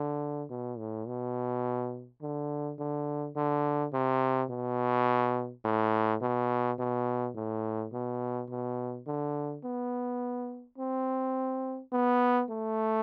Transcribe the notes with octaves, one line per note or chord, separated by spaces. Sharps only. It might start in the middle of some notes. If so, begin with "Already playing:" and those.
Already playing: D3
B2
A2
B2
D3
D3
D3
C3
B2
A2
B2
B2
A2
B2
B2
D3
B3
C4
B3
A3